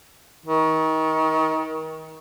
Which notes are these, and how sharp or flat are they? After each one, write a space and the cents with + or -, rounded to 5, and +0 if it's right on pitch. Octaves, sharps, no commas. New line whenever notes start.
D#3 +30